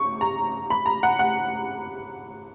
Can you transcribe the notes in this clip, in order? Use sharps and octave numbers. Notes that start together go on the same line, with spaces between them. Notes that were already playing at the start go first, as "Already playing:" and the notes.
Already playing: C#6
A#5
B5
A#5
F#5
F#5